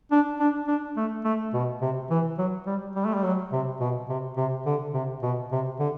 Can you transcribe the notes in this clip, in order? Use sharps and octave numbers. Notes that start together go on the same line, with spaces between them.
D4
D4
D4
A3
A3
B2
C3
E3
F#3
G3
G3
A3
G3
F#3
C3
B2
C3
C3
D3
C3
B2
C3
D3